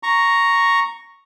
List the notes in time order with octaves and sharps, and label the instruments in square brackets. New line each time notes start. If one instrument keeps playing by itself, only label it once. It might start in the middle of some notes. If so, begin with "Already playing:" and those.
[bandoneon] A#5 C#6